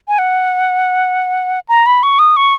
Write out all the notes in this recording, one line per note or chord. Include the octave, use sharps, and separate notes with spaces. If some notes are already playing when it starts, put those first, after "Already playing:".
G#5
F#5
A#5
B5
C#6
D#6
C#6